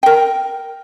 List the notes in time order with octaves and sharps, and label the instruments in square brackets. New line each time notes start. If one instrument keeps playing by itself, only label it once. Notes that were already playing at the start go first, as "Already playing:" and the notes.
[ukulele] A#4 G5